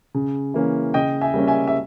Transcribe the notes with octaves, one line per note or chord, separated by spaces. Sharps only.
C#3
E3 A#3 C#4
C#3 D#5 G5
E5 G#5
G3 A#3 C#4
E5 G#5
E5